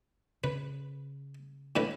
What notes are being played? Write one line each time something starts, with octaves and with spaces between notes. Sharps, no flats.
C#3 B4
A2 D3 B4